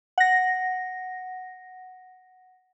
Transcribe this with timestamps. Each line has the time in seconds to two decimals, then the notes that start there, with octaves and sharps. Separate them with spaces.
0.18 F#5 A#6